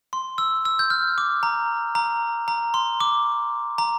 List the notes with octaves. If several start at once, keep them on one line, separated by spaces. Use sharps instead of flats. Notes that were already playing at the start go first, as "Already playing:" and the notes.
C6
E6
E6
G6
F6
D6
A#5
A#5
A#5
C6
D6
A#5